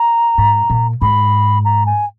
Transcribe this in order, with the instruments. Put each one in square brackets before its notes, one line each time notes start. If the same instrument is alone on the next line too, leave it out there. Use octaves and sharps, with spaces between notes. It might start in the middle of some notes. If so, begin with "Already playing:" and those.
Already playing: [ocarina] A#5
[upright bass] G#2
A#2
[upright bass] G#2 [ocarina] B5
[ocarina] A#5
G#5